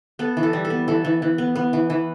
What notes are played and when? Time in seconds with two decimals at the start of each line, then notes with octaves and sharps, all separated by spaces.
0.19 B3 A4
0.37 E3
0.43 A4
0.53 G3
0.65 A4
0.70 B3
0.88 E3 A4
1.05 E3
1.22 E3
1.38 B3
1.56 B3
1.73 E3
1.90 E3